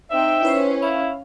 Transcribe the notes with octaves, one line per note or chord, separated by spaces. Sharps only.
C4 D#4 E5 G5
C#4 E4 B4 C5
E4 F5